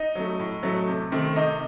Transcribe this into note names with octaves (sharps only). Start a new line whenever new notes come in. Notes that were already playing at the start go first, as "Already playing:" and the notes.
Already playing: D#4 D#5
F#3 A3
A2
F#3 A3
C3
D#3 A3 C4
C3 D#4 D#5